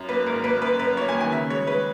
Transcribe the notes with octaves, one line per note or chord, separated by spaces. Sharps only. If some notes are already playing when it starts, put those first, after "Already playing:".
Already playing: F#2
A#3 B4
G#1 A#4
A#3 B4
F#2 B4
F#2 B4
A#3 C#5
G#5
D#3
G#5
C#3 E5
G#3 C#5
G#3 B4